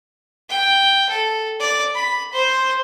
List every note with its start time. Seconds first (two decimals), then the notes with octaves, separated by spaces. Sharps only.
0.49 G5
1.10 A4
1.60 D5
1.94 B5
2.33 C5